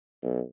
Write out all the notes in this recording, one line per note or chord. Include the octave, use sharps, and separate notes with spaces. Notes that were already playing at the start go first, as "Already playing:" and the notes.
B1